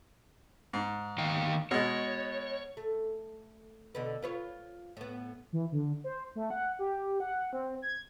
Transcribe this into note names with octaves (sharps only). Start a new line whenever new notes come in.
G#2
D#3 F5 G5
B2 G#3 C#5
A3
B2 D3 B4
F4 B4 C#5
A2 B3
E3
D3
C5
A3
F#5
G4
F#5
C4
G#6